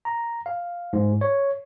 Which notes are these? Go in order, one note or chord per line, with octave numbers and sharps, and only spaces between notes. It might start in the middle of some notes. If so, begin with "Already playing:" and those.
A#5
F5
G#2
C#5